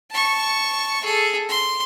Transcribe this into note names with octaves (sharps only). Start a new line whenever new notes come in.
A5 C#6
G#4 A4
C6